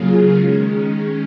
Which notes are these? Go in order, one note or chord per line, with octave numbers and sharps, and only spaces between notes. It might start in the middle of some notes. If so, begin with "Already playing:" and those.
Already playing: C#3 F#3 A#3 F4 G#4
D#3 G#3 C#4